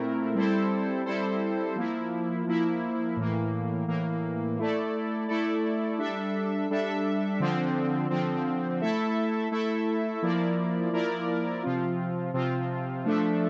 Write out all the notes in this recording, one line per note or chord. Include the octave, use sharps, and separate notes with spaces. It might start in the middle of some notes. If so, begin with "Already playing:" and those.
Already playing: A#2 A3 C4 E4 A#4
G3 C4 E4 A4 C5
G3 C4 E4 A4 C5
F3 A#3 E4
F3 A#3 E4
A2 E3 A#3
A2 E3 A#3
A3 E4 A4 D5
A3 E4 A4 D5
G3 D4 A4 E5
G3 D4 A4 E5
D3 F3 C4
D3 F3 C4
A3 E4 A4 E5
A3 E4 A4 E5
F3 A#3 E4 A#4 D5
F3 A#3 E4 A#4 D5
C3 F3 C4 F4
C3 F3 C4 F4
F3 A3 D4 A4 E5